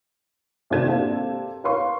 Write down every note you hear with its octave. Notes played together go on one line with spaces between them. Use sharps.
G#1 C3 D4 A4 G#6 E7
A#3 C4 D4 G4 A4
B4 C#5 F5 C6 C#6